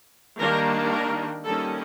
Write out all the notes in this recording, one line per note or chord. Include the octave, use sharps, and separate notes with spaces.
D#3 G3 A#3 D4 A#4
A#4
D#3 G3 A#3 C#4 A4